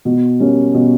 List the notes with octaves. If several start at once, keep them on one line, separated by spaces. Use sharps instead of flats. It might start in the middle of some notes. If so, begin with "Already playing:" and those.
B2
G3 A#3 C#4
B2